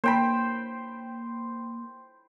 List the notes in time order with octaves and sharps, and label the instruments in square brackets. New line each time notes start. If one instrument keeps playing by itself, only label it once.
[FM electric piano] A#3 [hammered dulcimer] C5 G5 B5